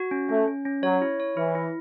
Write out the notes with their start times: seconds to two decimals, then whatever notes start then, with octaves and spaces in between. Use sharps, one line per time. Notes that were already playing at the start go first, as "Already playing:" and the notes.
Already playing: F#4
0.11 C#4
0.29 A3 C#4
0.48 C#4
0.65 C#4
0.83 F#3 C#5
1.02 E4
1.20 C#5
1.36 E3 E4
1.55 E4